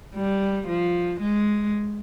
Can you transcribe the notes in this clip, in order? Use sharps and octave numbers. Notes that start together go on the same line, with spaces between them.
G3
F3
G#3